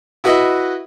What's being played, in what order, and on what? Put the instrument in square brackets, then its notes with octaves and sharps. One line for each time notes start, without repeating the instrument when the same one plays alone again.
[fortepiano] E4 F#4 B4 D#5 E5